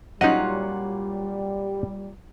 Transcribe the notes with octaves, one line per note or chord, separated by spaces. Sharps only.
A#2 F#3 G3 C#4 D#4 F4 D#5 F#5